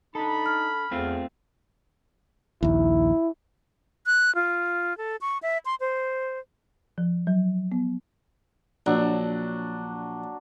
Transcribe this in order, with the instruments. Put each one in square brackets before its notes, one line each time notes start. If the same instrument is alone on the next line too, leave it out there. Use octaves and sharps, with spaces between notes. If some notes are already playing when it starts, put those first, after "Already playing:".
[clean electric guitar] D4 A4 [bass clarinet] D#4 [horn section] B5
[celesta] F6
[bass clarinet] E2 [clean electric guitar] A3 C4 F4
[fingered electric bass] A#1 D#2 [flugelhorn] E4
[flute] F#6
F4
A4
C#6
E5
C6
C5
[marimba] F3
F#3
B3
[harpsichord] A#1 [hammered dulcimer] F#3 D4